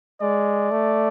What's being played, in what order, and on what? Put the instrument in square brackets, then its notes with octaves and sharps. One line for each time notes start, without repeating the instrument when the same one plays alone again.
[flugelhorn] G#3 [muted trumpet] D5
[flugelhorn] A3